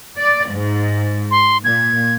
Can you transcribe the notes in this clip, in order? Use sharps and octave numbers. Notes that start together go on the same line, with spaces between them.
D5
G#2
C6
A#2 G#6